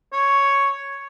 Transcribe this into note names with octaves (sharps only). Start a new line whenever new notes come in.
C#5